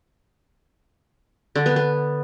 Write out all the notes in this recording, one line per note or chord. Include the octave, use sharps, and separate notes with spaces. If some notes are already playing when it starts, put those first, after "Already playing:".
D3
B3
B3